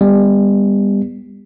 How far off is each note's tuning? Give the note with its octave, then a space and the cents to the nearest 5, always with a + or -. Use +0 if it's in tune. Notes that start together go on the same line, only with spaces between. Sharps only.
G3 +30 B3 +0